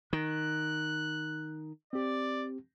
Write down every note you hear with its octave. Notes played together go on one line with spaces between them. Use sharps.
D#3 F#6
C4 G4 D5